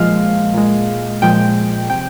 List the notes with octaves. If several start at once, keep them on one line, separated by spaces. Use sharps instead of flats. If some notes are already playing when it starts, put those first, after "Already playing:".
Already playing: A#2 F3 G#3 F5
A#2 G#3
A#2 F3 G#3 G5
C3 G5